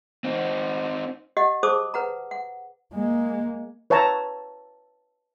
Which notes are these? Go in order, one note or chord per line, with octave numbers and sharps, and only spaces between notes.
C4 D#4
G4 D#5 F#5
G#4 C5 A5 D6 D#6
B4 F#5 A#5
F#5
G#3 A#3
B4 C#5 E5 A5 A#5